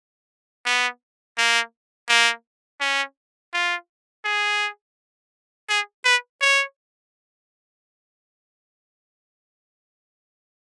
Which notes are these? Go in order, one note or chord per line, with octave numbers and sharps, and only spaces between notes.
B3
A#3
A#3
C#4
F4
G#4
G#4
B4
C#5